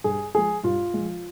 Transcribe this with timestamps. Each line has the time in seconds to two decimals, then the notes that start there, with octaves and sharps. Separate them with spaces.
0.04 G2 G#4
0.34 F3 G#3 G#4
0.64 G2 F4
0.94 F3 G#3